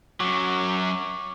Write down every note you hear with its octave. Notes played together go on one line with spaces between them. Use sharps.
F#2 F#3 C#6 D6